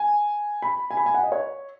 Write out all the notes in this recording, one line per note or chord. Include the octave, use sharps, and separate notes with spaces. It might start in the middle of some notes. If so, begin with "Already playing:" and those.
Already playing: G#5
B5
G#5
B5
G#5
F#5
D#5
C#5